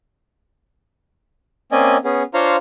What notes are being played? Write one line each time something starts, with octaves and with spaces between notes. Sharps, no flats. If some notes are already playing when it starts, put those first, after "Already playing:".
A#3 C4 C#4 D5 D#5 G#5
B3 C#4 G#4
D4 F4 C5 C#5 F5 A#5